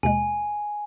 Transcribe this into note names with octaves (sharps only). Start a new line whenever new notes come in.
D#2 B2 G#3 G#5